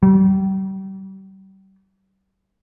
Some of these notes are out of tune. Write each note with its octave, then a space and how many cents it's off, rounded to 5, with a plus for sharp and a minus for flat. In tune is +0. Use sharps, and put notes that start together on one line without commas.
G3 -35